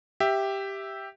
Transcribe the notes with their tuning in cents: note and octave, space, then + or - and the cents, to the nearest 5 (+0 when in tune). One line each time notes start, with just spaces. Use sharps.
G4 +0 E5 +0